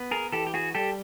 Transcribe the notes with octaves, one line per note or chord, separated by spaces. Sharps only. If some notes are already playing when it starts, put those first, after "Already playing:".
Already playing: B3
G#4 A#4
E3 G4 A4
G4
F#4 G#4
G3 G4 A4